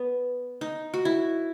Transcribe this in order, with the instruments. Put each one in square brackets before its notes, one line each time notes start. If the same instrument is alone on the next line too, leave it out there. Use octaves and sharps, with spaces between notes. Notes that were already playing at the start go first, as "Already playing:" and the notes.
Already playing: [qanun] B3
D#4
F#4
E4